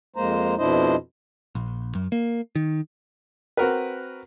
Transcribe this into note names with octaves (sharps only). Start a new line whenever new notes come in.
F2 G#3 A#3 C5 A#5
F2 B2 D4 E4 C5 D#5
A#1
F#2
A#3
D#3
C4 F#4 A#4 B4